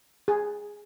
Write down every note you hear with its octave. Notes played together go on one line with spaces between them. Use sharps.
G#4